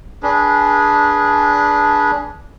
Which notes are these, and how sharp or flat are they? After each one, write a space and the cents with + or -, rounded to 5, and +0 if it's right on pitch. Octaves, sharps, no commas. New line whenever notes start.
D4 -15 G#4 +0 B4 -25